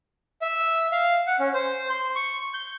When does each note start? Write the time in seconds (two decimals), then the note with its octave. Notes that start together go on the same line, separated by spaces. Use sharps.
0.42 E5
0.92 F5
1.27 F#5
1.40 C#4
1.54 C5
1.90 C6
2.15 C#6
2.54 G6